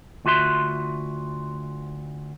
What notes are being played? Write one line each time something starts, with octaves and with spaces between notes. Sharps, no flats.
D2 F4 F#4 E5 C6